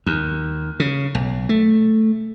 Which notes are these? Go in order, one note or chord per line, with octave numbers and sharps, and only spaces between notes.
D#2
C#3
B1
A3